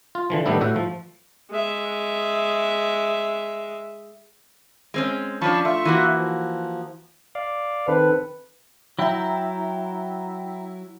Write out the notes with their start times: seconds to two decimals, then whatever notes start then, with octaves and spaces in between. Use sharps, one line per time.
0.15 F4
0.30 D3 E3 F3
0.46 A2 D#3 G3 B3 D4 E4
0.61 A2 F#4 E5
0.76 F3
1.51 G#3 E5
4.94 G#3 C4 C#4
5.42 F3 C#4 D4 A5 B5 C#6
5.65 A3 F4 E5 C#6
5.85 E3 A#3 F#4
6.15 F3
7.35 D5 F5
7.88 D#3 C4 A4 B4
8.99 F#3 E4 E5 G5 A#5